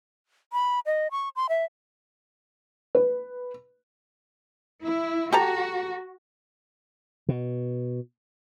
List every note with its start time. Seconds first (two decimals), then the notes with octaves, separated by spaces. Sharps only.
0.53 B5
0.86 D#5
1.11 C#6
1.36 C6
1.49 E5
2.95 B4
4.83 E4
5.32 F#4 G4 A4 A#5
7.29 B2